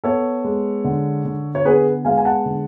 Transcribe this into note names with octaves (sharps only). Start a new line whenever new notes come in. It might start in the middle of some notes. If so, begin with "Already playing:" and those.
B3 A4 C#5
G#3
D3
D3
C#5
B3 G#4 B4
G#3 F5 G#5
G#5
F#5 A5
D3